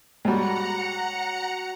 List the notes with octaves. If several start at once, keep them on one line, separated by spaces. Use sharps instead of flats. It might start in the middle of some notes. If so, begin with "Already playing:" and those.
G#2 F#3 G3 F#5 G5 A#5 C#7